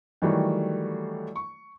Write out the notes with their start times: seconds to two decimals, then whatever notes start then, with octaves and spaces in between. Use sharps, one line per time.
0.22 D#3 E3 F#3 G3 A3
1.36 C#6